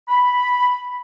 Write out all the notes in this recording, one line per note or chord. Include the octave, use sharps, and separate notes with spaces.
B5